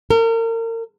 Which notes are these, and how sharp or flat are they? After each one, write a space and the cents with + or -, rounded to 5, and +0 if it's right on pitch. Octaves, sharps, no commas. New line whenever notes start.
A#4 -35